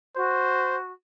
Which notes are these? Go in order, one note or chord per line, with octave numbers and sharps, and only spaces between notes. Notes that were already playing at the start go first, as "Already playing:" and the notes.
F#4 C5